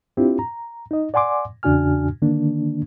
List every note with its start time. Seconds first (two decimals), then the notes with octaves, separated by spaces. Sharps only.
0.17 C4 D4 E4 F4 G4
0.39 A#5
0.91 D#4 D#5
1.14 D5 F#5 G#5 C6 D6
1.63 E2 C#3 D4 F#4 G#5 F6
2.22 D3 D#3 A#3 D4